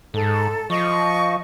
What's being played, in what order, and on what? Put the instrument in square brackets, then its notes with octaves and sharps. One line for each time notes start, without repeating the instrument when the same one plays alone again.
[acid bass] G#2 [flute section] A4
[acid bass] F3 [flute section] D#5 C#6